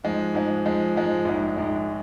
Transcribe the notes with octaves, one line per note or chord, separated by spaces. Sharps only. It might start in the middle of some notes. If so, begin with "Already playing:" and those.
G#2 F3 G#3
G#2 F3 G#3
G#2 F3 G#3
G#2 F3 G#3
A#1 G#2 G#3
A#1 G#2 G#3